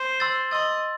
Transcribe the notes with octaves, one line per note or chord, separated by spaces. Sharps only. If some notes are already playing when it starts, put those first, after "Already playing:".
Already playing: C5
C6 E6 A6
D#5 C6 E6 A6